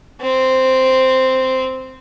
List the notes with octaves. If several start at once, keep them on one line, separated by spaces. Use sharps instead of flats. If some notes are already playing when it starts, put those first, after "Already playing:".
C4